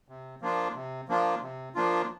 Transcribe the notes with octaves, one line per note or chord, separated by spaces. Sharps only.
C3
F3 A#3 D4 F4
C3
F3 A#3 D4 F4
C3
F3 A#3 D4 F4